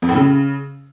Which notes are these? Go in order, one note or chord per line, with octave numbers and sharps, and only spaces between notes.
F2
A2
C#3